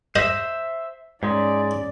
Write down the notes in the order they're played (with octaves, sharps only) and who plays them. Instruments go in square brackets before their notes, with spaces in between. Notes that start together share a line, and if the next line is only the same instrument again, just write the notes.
[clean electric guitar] C5 E5 [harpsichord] D#5
[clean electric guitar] G#2 G#3 [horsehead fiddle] C#4 D5